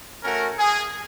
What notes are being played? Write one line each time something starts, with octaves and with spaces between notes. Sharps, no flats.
A3 C#4 F#4 A#4
G#4